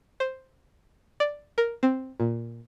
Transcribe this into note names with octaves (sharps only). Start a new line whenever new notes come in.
C5
D5
A#4
C4
A#2